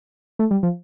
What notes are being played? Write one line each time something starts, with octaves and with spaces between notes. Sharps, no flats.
A3
G3
F3